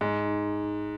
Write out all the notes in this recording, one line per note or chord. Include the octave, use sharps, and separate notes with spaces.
G#2